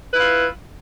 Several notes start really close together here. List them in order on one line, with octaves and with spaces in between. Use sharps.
B4 E4 F4